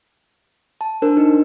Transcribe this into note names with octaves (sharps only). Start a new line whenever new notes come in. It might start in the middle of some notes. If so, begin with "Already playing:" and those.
A5
D4 A#4 C5
D#4